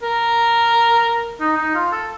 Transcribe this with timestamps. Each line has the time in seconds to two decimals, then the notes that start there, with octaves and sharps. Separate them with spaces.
0.02 A#4
1.40 D#4
1.57 D#4
1.75 F4
1.92 A4